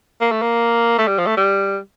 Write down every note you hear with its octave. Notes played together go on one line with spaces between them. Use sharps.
A#3
A3
A#3
A3
G3
F3
A3
G3